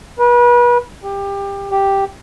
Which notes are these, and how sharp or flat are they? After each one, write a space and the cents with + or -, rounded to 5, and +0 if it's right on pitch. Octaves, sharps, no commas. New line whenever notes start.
B4 -35
G4 +20
G4 +0